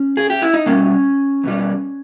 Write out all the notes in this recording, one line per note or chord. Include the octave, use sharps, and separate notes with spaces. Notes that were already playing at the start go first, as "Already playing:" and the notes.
Already playing: C#4
G#4
G4
E4
D#4
B2 G3 A#3 C#4
E2 B2 G3